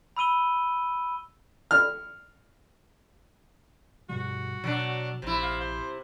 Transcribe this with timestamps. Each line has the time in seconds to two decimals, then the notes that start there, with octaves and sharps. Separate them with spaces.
0.17 B5 E6 D#7 G7
1.71 F6
4.09 G2 B2 G3 F#4
4.64 B2 F#3 D4
5.22 A#1 C3 E4
5.42 F5
5.61 C5